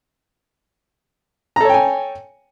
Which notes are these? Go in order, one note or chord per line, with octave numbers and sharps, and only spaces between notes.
A4 C#5 G5 G#5 A#5